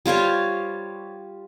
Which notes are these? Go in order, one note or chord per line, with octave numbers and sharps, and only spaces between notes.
G3 F4 C5 C#5